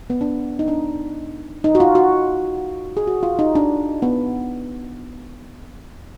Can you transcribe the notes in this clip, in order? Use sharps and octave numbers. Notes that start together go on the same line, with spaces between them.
B3
D4
D#4
D4
D#4
F#4
F4
F#4
G#4
F#4
F4
D#4
D4
B3